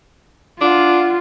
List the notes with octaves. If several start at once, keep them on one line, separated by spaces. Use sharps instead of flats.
D4 F4 F#5